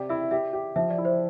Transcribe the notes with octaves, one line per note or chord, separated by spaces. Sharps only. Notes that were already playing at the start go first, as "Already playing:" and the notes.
Already playing: C3 G4 D5
E4 E5
G4 E5
G4
F3 E5
D5
E4
C5